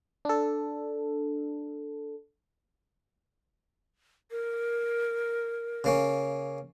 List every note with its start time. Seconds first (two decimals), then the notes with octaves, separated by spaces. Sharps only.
0.25 D4 A4
4.31 A#4
5.84 C#3 A#3 C#4